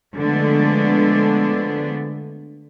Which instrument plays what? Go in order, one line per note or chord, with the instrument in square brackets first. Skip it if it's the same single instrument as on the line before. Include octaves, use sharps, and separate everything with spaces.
[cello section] D3 F3 G#3 A3 B3 D4